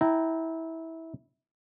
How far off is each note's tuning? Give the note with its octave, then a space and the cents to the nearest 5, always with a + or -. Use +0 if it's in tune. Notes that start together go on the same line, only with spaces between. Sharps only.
E4 -20 G5 -20 A#5 -15